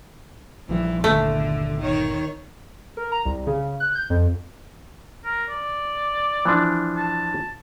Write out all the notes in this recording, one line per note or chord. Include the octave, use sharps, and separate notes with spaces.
A#1 E3 F3 G3
G1 D#2 A#2 D3 A3
D#3 C#5
A#4
A#5
C2
C#3
F#6
G6
F2
A#4
D5
E3 F3 D4
A5